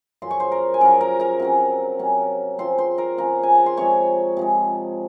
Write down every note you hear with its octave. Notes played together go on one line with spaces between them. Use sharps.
F#2 C#3 F3 C6
C#6
C5 C6
A#4 A#5
G#5
F#2 C#3 F3 A#4 A#5
A#4 A#5
A#4 A#5
C3 F#3 C#4
C3 F#3 C#4
C#3 F3 C4 C5 C6
C5 C6
A#4 A#5
C#3 F3 C4 A#4 A#5
G#5
A#5
C6
C3 F3 G#3 C#5 C#6
C3 F3 G#3